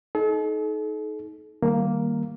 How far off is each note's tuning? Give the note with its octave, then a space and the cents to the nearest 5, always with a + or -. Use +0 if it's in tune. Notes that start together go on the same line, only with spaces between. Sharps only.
D#4 +15 A4 -45
D#3 +0 G3 +0 A#3 +0